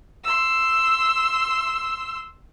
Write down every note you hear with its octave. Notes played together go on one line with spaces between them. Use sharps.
C6 E6